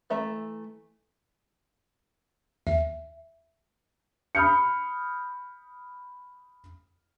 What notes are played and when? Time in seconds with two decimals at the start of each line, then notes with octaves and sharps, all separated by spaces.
0.10 E3 A3 E5 A#5
2.67 D#2 E5
4.35 B5 D#6 F6 G6 C#7